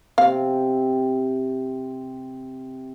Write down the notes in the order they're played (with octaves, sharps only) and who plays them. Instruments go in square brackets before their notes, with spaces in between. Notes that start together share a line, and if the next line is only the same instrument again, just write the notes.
[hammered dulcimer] C3 C4 G4 [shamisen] F5